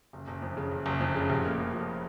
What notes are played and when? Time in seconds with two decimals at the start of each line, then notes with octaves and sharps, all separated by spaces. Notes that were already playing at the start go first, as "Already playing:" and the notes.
0.13 F#1
0.27 F#1
0.42 F2
0.57 C#3
0.71 F#1
0.86 F#1
1.00 F2
1.15 C#3
1.30 F1
1.44 A#3
1.59 F2
1.73 F3